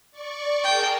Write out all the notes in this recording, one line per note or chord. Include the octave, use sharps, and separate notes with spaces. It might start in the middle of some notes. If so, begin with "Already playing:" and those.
D5 C#6
G#4 A#4 G5 A5